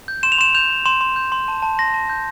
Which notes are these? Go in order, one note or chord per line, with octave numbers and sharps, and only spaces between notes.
G6
C6 E7
F7
C6 E7
G6 F7
C6
C6 E7
C6
G6
C6
A5
A5
C6 A#6
A5
G6